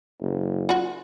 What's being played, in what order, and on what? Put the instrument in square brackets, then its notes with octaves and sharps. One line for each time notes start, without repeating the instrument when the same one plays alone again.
[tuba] F#1
[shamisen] F4 F#4